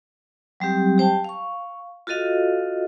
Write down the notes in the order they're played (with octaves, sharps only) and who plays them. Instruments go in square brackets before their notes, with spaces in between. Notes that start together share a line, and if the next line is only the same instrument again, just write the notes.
[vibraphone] F#3 G3 C4 G4
G4 C5 G5 A5
F5 C#6
F4 F#4 A4 D#5 F5